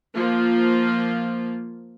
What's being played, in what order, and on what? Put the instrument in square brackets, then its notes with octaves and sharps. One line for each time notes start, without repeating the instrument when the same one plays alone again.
[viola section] F3 A#3 F4